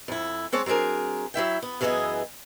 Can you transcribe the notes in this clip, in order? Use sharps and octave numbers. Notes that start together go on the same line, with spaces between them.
F2 E4
G#3 C4 C#5 A5
F#3 C4 D4 G#4 A#4
F#3 E4 E5 G5
B3
F#2 E3 B3 F4 G#4 D#5